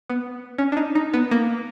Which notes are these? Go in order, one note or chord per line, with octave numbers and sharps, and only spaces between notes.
B3
C#4
D4
D#4
D#4
B3
A#3